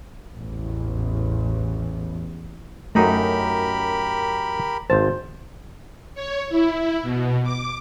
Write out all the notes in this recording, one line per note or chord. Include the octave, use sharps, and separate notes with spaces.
A1 E2
F#2 A3 D#4 G4 A#4 A#5 B5
G#1 C5 A5
C#5
E4
B2
D6